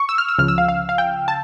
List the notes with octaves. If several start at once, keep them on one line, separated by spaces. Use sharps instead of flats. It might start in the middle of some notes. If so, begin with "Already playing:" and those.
Already playing: C#6
E6
F6
E6
C#2 C#3 F3 F6
E6
F5
F5
F5
G5
A5